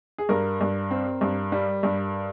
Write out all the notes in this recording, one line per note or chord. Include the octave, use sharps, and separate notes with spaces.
G#4
G2 A#4
G2
C4
G2
G3
G2